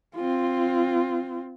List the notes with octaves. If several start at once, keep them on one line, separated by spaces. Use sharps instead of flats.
C4 F4